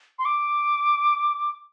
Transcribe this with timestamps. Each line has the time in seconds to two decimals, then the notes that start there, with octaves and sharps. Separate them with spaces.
0.19 C6
0.25 D6